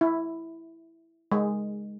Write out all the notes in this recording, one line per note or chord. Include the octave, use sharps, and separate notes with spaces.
E4
G#3